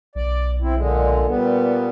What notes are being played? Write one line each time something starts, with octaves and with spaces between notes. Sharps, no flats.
B1 D5
C4 E4
A#2 D3 G#3
A#2 G3 B3